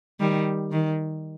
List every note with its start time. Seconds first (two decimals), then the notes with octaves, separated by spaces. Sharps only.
0.20 D#3 G3
0.72 D#3